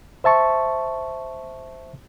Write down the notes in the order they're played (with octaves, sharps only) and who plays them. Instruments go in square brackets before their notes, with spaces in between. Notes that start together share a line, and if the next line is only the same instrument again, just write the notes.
[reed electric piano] C5 E5 A5 C#6